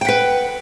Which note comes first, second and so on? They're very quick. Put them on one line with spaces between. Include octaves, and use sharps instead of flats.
G5 F#5 B4